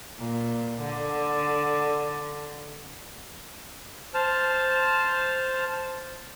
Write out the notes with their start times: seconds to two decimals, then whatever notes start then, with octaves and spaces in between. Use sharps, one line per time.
0.18 A#2
0.81 D3
4.14 C5 A5 F6